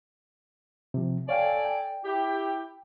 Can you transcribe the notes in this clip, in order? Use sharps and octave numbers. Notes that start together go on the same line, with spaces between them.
C3 F3
A4 C#5 D5 F5 G5 G#5
G5
E4 G4